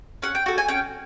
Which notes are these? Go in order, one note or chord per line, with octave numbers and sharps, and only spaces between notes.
C#4 F#5
G5
F#4 A4
G#5
C#4 G5